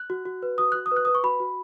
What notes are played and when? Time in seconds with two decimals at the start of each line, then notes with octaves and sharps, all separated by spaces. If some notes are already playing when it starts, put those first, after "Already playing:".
Already playing: F#6
0.10 F#4
0.25 F#4
0.43 B4
0.58 F#4 D#6
0.72 F#4 F#6
0.86 D#6
0.92 B4 F#6
1.05 B4 D#6
1.15 C#6
1.24 F#4 B5
1.40 F#4